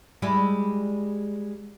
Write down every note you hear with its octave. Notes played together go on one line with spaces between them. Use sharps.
G3 G#3 E4